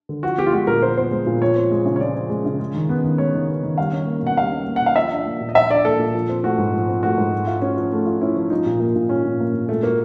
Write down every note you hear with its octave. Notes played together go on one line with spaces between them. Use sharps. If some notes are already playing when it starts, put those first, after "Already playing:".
D3
F3 F#4
B3 G4
F4
G#3 F#4
A#2 A#4
F3 C5
B3 C5
G#3
A#2
F3 C#5
C4
G#3
C#3
C#5
F3 D5
C4
G#3
C#3
G#3
D#3
B3
D#3
G#3 C#5
D#3
B3
D#3
G3 F5
C#4
A#3
B2 F#5
G3 F5
C#4
A#3
B2 F#5
F5
F3 E5
D4
A#3
A#2
D#5
F3 E5
D4 D5
A#3 A4
A#2
F3
C4
A3 F#4
G#2
F3
C4
A3 F#4
G#2
A3
F4
C#4 F#4
F3
A3
F4
C#4 E4
F3
F3 D#4
A#2
A#3
A#2
F3 C#4
A#2
A#3
A#2
G#3 A3
A#3 F#4